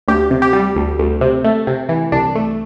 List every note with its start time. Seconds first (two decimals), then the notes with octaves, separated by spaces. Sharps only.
0.08 D2 G4
0.30 C3
0.42 G4
0.53 G3
0.76 D2
0.99 D2
1.21 C3
1.44 A3
1.67 C3
1.89 E3
2.12 C2 D4
2.35 A3